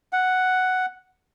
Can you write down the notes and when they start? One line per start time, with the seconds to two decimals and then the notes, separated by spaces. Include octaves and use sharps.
0.13 F#5